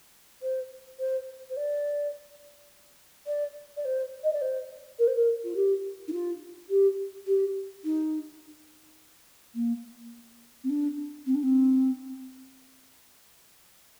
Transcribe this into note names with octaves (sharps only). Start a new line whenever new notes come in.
C5
C5
C5
D5
D5
D5
C5
D#5
D5
C5
A#4
C5
A#4
F4
G4
D#4
F4
G4
G4
D#4
A#3
C4
D4
C4
D4
C4